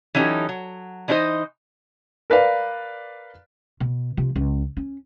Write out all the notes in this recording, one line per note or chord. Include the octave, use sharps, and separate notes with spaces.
E3 F#3 C#4 D#4 G4 A4
F#3
E3 D4 D#4 G#4 C5 D#5
A#4 B4 D5 F5
B2
C3 F3
C#2
C#4